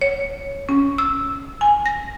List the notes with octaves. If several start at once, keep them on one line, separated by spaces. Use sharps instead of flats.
C#5
C#4
E6
G#5
A#6